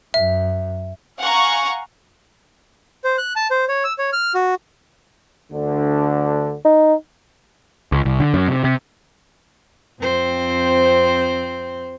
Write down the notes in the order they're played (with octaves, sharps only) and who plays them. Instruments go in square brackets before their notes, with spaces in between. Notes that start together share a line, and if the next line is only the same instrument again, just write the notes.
[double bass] F#2 [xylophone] E5
[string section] F5 F#5 G#5 A#5 C#6
[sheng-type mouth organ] C5
F#6
A5
C5
C#5
E6
C#5
F6
F#4
[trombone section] D2 D3
[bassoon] D#4
[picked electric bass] C#2
C2
D3
F#2
C3
C3
[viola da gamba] F2 C4 C5